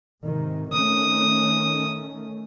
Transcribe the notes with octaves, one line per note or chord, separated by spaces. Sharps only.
G#2 C3 D#3
D#3 A3 C#4 D#6